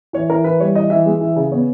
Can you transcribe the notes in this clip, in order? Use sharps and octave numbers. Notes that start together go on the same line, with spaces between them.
E3 C#5
E3 A#4
E3 B4
G3 C#5
E3 D#5
E3 E5
G#3
E3
C#3
B3 C#5